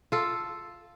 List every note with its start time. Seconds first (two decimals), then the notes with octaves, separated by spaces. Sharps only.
0.12 F4 A4